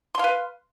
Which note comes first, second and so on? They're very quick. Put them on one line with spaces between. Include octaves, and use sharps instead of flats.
C6 F5 B4